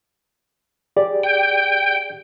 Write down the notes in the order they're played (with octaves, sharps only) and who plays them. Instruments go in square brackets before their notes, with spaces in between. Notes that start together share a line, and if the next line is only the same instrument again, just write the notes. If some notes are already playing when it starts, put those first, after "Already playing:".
[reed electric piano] G4 G#4 D5
[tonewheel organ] G5